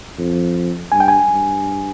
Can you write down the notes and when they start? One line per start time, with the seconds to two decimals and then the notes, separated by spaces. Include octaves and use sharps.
0.18 F2
0.92 G2 G#5
1.00 G5
1.08 G#5
1.29 G2